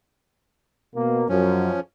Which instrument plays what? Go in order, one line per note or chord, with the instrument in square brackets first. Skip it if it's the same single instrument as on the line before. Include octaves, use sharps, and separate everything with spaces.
[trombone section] B2 A#3
[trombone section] F#2 [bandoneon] F3 C#4